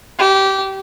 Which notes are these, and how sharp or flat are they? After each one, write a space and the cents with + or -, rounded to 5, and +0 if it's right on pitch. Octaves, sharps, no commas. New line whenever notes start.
G4 -20